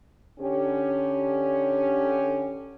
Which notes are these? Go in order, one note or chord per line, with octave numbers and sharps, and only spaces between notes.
D3 C#4 G4